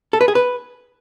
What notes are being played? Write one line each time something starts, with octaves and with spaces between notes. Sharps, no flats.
A4
B4
G#4
B4